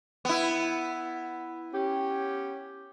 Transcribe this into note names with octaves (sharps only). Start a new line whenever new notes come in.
B3 E4
C#4 G4